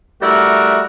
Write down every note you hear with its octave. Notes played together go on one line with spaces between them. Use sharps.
G3 A3 E4 F#4 A#4